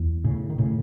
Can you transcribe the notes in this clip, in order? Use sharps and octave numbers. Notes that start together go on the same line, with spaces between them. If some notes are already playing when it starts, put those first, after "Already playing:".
Already playing: E2
A2 C#3
D#3
A2 C#3